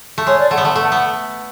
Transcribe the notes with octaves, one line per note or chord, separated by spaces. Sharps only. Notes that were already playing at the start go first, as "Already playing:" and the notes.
A3
G#3 C#5
D5
A3 F#5
B3
A3 A5
A3 F#5
B3 F#5